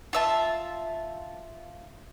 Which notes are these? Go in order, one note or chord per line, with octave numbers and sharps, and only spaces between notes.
F4 E5 A5